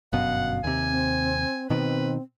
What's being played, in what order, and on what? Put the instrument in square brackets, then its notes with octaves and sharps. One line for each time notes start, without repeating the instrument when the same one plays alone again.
[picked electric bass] G1 F#2 B2 [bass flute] F5 [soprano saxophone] F#5
[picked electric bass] D#2 C3 [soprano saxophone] G#5
[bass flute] C4
[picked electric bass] B2 D#3 [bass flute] C4 [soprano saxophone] B4